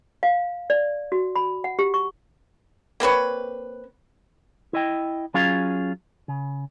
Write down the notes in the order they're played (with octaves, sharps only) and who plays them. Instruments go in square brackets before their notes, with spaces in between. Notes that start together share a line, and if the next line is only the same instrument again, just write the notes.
[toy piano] F5
D5
F#4
B5
F#5
G4
C#6
[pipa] A#3 C4 B4 C#5
[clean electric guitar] E4 D#5 G5
F#3 C#4 F4 G#4 F5
C#3